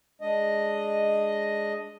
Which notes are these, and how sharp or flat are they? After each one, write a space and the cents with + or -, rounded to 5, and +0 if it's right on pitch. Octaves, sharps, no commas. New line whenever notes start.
G#3 +0 D4 +0 D#5 +0